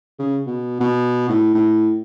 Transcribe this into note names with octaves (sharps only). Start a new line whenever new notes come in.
C#3
B2
B2
A2
A2